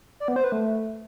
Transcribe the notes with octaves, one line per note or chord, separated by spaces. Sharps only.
D5
B3
C5
B4
A3